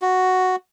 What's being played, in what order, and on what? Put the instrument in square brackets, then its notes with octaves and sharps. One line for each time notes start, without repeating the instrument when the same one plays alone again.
[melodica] F#4